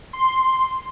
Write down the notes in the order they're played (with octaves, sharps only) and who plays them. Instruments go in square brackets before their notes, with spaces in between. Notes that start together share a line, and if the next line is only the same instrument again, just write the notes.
[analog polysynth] C6